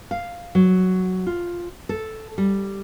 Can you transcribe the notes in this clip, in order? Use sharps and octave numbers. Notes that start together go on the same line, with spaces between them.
F5
F#3
F4
A4
G3